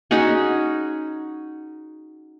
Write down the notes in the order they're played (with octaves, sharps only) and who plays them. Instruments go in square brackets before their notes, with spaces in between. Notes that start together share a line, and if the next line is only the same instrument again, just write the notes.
[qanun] C#4 D#4 F#4 G#4